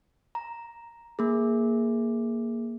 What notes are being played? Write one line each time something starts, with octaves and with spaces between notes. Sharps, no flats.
A#5
A#3 G#4